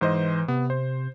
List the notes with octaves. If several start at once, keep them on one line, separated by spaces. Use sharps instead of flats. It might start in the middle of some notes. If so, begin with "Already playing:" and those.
G#2 E3 C5 D#5
C3 B3
C5